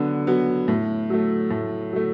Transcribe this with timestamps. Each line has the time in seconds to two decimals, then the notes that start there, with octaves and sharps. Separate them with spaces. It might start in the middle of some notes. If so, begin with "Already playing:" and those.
Already playing: D3 F#3 B3
0.27 F#3 B3
0.68 A2
1.10 F#3 A3
1.51 A2
1.93 F#3 A3